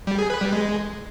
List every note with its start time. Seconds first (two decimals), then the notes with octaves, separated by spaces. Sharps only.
0.07 G3
0.19 G#4
0.30 B4
0.41 G3
0.52 G#3